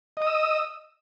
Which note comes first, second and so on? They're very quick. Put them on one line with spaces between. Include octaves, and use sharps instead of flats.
D#5 D#6 E6